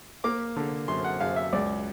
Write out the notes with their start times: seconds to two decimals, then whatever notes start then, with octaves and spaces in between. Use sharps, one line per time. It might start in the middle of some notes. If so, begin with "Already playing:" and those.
0.24 A#3 D6
0.56 D3
0.88 F#2 C6
1.04 F#5
1.20 F#2 F5
1.36 E5
1.53 C#2 D5